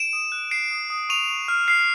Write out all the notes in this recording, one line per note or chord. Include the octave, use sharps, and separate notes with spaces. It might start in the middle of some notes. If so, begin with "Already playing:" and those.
Already playing: D7 E7
D#6
F#6
F#6 C7 D7
D#6
D#6
C#6 D#7 F7
C#6
F6
F6 C7